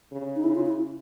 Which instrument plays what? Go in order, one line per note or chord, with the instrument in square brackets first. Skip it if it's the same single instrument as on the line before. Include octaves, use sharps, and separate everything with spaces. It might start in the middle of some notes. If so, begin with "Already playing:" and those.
[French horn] C#3
[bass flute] D#4
[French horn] C#3 [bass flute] E4
[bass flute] F4
E4